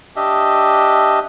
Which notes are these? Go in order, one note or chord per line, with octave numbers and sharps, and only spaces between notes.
D4 G4 D#5 E5